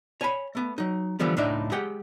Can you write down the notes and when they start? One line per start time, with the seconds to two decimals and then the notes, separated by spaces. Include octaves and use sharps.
0.21 C#5 G#5 A5 B5
0.55 A3 B3
0.78 F#3 D#4
1.19 D3 E3 F3 G3 B3
1.37 C#2 A2 D4 D#4 E5
1.71 G#3 G4 F#5 G5